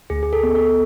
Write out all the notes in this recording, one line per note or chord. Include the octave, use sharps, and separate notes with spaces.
D2 G#4
G#4
A4
B3
A4